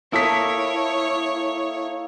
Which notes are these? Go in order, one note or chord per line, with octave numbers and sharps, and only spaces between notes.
A#3 E4 A4 C#5 D#5 E6 B6